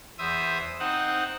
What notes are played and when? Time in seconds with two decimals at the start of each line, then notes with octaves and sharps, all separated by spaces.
0.19 E2 C5 E5 D#6
0.79 C4 D#4 F#5